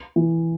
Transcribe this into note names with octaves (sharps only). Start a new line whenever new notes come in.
E3